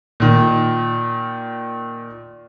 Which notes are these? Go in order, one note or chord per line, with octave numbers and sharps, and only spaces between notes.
A#2 D#3